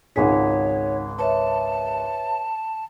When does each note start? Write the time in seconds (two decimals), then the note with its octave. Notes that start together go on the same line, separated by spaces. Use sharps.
0.16 G#1 C#2 D#4 G#4 C#5 F#5 B6
1.19 B4 C#5 E5 A5